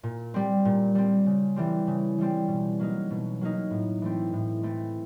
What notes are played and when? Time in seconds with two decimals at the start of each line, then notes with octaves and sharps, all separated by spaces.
0.03 A#2
0.34 G3 C4
0.65 A#2
0.95 G3 C4
1.26 C#3
1.56 E3 G3 C4
1.87 C#3
2.18 E3 G3 C4
2.48 B2
2.79 F#3 A#3 D#4
3.10 B2
3.41 F#3 A#3 D#4
3.71 A2
4.02 E3 A3 C4
4.33 A2
4.63 E3 A3 C4